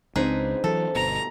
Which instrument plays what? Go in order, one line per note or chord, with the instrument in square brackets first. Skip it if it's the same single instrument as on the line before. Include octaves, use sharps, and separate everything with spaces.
[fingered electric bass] C#2 [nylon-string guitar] C4 D4 C5 [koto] D#4 G#4 B4
[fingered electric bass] E3 F#3 [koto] A4
[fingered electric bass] G1 B2 [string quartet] A#5